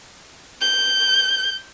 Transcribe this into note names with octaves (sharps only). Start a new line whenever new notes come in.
G6